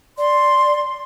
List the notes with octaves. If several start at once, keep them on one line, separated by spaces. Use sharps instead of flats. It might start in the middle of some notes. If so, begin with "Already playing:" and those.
D5 C6